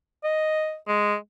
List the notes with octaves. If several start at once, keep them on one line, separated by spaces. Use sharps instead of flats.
D#5
G#3